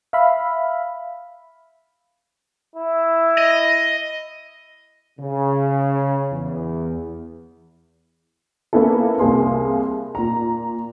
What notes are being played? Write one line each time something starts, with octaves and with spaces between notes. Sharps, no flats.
E5 F5 B5
E4
D#5
C#3
E2
A#3 B3 C#4 E4 A4
C2 A#3 G#4 C6
A#2 A#5